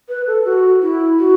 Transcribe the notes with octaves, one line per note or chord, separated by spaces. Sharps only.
B4
A4
F#4
E4
F#4